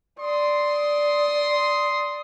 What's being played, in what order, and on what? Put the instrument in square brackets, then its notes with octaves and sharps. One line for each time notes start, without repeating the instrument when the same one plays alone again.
[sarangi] D5 [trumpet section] C6 D#6